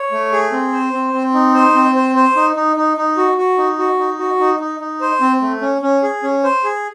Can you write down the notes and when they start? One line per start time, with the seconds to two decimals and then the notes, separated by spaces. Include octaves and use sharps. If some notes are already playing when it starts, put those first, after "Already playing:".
Already playing: C#5
0.12 A3
0.32 G#4
0.52 C4
0.73 C5
0.93 C4
1.13 C4
1.34 D#4
1.54 C5
1.75 C4
1.95 C5
2.16 C5
2.36 D#4
2.56 D#4
2.77 D#4
2.97 D#4
3.17 F#4
3.38 F#4
3.58 D#4
3.79 F#4
3.99 D#4
4.19 F#4
4.40 D#4
4.60 D#4
4.80 D#4
5.01 C5
5.21 C4
5.41 A3
5.61 C#4
5.82 C#4
6.03 G#4
6.23 C#4
6.44 C5
6.64 G#4